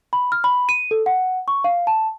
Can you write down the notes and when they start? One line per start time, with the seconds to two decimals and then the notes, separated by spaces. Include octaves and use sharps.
0.13 B5
0.32 F6
0.44 B5
0.69 D#7
0.91 A4
1.06 F#5
1.48 C#6
1.64 F5
1.87 A5